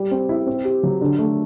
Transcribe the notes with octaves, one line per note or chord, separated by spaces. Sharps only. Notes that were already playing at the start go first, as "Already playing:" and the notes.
Already playing: G3
C4
E4
C4
G4
F#3
D3
A3